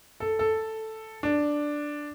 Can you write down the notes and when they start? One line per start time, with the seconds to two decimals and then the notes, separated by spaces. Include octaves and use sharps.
0.20 A4
0.39 A4
1.23 D4